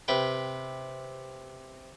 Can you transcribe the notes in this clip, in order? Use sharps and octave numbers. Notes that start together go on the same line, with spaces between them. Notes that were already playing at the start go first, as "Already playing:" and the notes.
C3 B4 G5